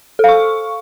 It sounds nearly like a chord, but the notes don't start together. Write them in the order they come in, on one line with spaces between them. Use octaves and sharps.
A4 F5 C#6